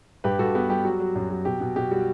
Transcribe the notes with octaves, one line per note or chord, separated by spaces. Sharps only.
G2 G4 B4
G2 F#4 A4
B3 G4
G3 G4
F#3 F#4
F#3
F#2
F#3
B2 G4
B2
B2 G4
G3 F#4